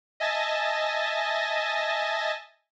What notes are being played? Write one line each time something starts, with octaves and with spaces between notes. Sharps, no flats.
D#5 E5 G#5 A5 A6 A#6